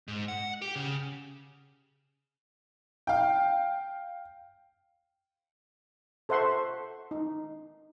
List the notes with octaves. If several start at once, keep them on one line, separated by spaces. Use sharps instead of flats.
G#2
F#5
G4
C#3
F5 G5
A4 C5 E5 F#5 C6 C#6
D#4